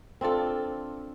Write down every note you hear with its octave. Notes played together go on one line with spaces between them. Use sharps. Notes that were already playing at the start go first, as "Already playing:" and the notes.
C4 D4 F4 A4